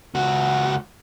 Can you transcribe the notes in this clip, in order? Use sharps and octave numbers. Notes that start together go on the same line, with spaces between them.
C#2 F#4